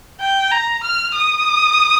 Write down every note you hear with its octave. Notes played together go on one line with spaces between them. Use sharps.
G5
A#5
F6
D#6